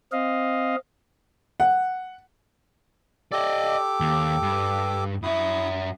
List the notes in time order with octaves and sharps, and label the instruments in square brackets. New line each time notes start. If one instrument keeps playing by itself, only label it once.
[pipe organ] C4 D#5 F5
[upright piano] F#5
[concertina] G4 A4 D6 [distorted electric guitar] D5 D#5
[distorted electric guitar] D#2
G2
[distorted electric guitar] F#2 E5 [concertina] E4 D#6